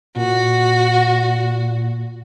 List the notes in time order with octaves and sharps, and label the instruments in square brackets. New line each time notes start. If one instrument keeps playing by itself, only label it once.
[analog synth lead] A#2 [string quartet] F#4